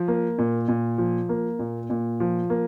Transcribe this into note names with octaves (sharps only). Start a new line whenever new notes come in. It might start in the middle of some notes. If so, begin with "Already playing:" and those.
Already playing: F3
A#3
A#2
A#2
F3
A#3
A#2
A#2
F3
A#3